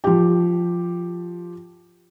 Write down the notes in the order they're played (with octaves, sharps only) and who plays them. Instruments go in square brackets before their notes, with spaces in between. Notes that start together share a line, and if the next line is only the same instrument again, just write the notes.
[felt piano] F3 G4